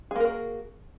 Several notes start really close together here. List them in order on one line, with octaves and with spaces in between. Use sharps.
G#4 A#3 A#4 F#4